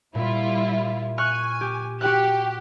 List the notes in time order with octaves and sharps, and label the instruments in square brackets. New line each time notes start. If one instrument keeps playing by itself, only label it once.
[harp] A#2 [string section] G3 E4 F4
[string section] G#5 [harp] C#6 F6 F#6
[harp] G4
[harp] F#4 F#6 [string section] G4